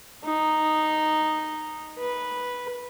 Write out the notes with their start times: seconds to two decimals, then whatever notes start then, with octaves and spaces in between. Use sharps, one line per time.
0.24 D#4
1.99 B4